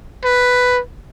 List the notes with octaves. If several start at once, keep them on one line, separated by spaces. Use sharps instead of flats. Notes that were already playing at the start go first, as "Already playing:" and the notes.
B4